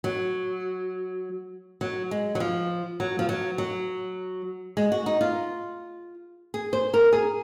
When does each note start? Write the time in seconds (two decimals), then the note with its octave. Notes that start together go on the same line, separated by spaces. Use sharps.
0.04 F#3
1.81 F#3
2.11 G#3
2.35 F#3
2.40 F3
3.00 F#3
3.19 F3
3.29 F#3
3.58 F#3
4.77 G#3
4.92 F#4
5.06 D#4
5.21 F4
6.54 G#4
6.73 C5
6.94 A#4
7.13 G#4